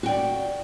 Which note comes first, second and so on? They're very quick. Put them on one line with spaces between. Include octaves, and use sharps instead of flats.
F#4 G5 D5